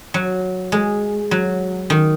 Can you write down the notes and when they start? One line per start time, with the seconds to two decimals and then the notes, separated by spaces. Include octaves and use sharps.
0.14 F#3
0.72 G#3
1.31 F#3
1.90 D#3